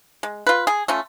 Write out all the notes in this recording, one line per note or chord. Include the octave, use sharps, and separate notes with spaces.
G#3
F4 B4
G#4
A3 C#4 F4